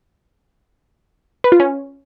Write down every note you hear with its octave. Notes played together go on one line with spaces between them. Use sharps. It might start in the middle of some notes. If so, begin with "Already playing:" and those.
B4
F4
C#4